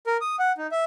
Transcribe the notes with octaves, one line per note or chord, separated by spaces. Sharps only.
A#4
D#6
F#5
D#4
E5